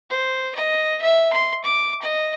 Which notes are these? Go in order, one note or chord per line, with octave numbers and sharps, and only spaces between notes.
C5
D#5
E5
C6
D6
D#5